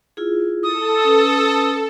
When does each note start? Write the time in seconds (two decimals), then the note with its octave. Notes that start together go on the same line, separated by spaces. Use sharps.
0.17 E4 F4 G#4
0.63 E4 A4 D#6
1.05 C#4 B4